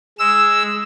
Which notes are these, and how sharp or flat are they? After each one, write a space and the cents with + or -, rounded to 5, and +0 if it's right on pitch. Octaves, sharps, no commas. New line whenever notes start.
G#3 +0 E6 +0